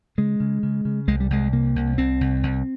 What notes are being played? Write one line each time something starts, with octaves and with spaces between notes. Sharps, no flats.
C#3 G#3
C#3
C#3
C#3
C2 G#3
G3
C2 G#3
C3 A#3
C2
C2 C4
C2
C2